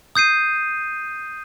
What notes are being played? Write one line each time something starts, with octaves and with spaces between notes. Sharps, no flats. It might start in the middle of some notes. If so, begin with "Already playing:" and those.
D#6 G6 C7 D#7